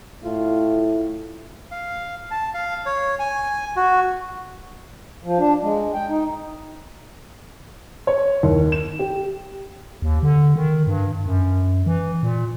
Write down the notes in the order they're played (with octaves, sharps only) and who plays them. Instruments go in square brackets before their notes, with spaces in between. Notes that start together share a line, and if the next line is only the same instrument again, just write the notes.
[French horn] A2 [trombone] F4
[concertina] F5
A5
F5
C#5
G#5
F#4
[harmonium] F3
D4
G#3
G5
D#4
[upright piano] C#5
D#2
E7
G4
[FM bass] D#2
D3
D#3
G2
F#2
E3
A#2